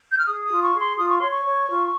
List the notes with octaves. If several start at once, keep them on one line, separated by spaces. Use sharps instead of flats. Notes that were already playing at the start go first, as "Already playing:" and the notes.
G6
F6
G#4 D#6
D#6
F4
C#6
G#4
C6
F4 D#6
C#6
C#5 C6
C#6
C#5
F4